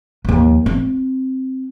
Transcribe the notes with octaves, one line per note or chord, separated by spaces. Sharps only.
D#2 F3
C4